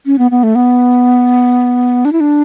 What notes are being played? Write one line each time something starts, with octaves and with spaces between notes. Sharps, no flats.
C#4
B3
B3
A3
B3
D4
E4
D4